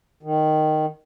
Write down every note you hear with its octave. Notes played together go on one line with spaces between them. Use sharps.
D#3